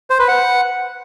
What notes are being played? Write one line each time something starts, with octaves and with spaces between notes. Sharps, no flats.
C5
B4
F#5